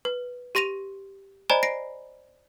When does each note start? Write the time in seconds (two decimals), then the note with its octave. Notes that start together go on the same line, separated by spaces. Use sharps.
0.05 B4
0.55 G4 C6 A#6 D#7 F7
1.50 C5 D5 D#5 G#5 A#5 B5
1.63 A#6 C7 D7